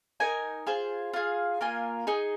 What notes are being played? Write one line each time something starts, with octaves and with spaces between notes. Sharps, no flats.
D#4 A#4 G#5
F4 G#4 C5
F4 G#4 F5
A#3 F4 A#4 G#5
D#4 G#4 D#5